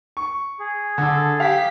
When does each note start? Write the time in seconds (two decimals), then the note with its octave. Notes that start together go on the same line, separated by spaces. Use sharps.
0.17 C#6
0.59 G#4
0.98 D3 A4
1.40 G4 F5 B6